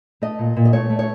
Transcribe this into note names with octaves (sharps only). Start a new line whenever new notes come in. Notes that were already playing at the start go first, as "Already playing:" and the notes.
A3 D#5
A#2
A#2
D#5
A3 C#5
A3
C#5